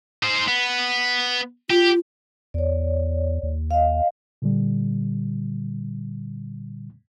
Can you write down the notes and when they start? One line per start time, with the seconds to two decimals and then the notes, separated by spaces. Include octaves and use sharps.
0.23 D#4 C5
0.48 B3
1.70 F4 G4
2.54 E2 C#5 D5
3.43 D#2
3.71 D#5 F5
4.42 A#2 D3 G3